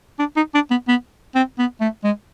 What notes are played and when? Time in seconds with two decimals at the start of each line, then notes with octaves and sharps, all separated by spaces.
0.19 D4
0.37 D#4
0.55 D4
0.71 B3
0.88 B3
1.35 C4
1.59 B3
1.81 A3
2.04 G#3